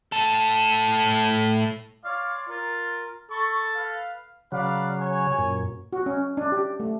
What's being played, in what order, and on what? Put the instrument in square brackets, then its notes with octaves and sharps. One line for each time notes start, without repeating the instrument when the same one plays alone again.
[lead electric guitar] A2 A4
[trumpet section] C#5 D5 C6 [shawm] F5
[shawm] F4 [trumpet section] A#4
[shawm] A4 [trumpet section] B5 C#6
[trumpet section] B4 F5
[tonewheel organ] C#3 F#3 [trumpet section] B4 D5 F5
[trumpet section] C#5 G#5
[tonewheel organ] F#2 A#2
[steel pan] F#4
C#4
D4
G4
A3